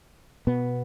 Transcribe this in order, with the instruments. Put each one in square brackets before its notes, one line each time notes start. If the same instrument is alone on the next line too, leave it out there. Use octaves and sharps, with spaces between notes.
[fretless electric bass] B2 B3